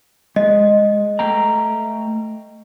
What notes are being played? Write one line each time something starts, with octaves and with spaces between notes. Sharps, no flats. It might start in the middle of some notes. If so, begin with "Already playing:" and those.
G#3 D#5
A3 G5 A#5